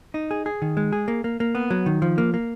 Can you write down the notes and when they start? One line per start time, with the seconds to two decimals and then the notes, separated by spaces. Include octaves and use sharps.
0.14 D#4
0.31 G#4
0.46 G#4
0.62 D#3
0.77 G#3
0.93 G#4
1.08 A#3
1.24 A#3
1.40 A#3
1.55 B3
1.70 F#3
1.86 D#3
2.02 F3
2.18 A#3
2.34 A#3